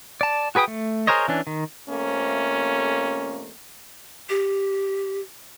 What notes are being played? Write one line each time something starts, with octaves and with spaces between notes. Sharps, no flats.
D5 A5
F#4 G#4 B4 G5 D#6
A3
G#4 A#4 C5 C#5 D#5
E3 C#4 D4
D#3
F2 C3 A3 A#3 C#4
G4